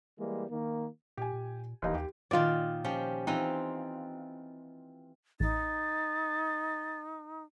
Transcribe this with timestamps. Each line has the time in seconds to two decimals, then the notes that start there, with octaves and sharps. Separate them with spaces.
0.19 E3 G3 G#3 A#3
0.50 D#3 A#3
1.17 A#2 G4 G#5
1.33 A#2
1.82 D#1 D#2 E3 D#4
1.94 D#2 G4
2.31 A#2 D#3 F4 D5
2.84 F3 C#4 G4
3.27 E3 C4 D#4 F4
5.40 A1 D#4 A6